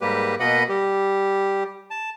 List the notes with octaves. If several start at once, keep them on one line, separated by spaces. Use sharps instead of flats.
G#2 G3 A#3 G4 B4
B2 A#3 B4 D#5 F#5 B5
G3 G4
A5